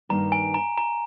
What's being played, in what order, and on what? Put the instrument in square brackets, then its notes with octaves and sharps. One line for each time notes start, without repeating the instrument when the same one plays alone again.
[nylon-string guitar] G2 D#3 A#3 [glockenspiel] A#5
[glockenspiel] G#5
A#5
A#5